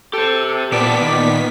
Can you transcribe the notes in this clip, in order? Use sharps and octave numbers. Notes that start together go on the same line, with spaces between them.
G4 A4 C5
E2 A#2 B3 G4 D5 A5 B6
D#3